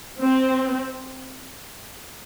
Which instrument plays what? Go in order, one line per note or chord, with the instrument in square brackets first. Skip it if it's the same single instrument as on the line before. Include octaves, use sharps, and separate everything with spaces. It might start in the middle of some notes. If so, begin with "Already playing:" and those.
[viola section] C4